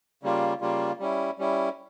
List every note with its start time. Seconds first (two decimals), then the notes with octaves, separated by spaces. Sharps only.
0.23 C#3 G3 A#3 F4
0.61 C#3 G3 A#3 F4
1.00 G3 C#4 E4
1.38 G3 C#4 E4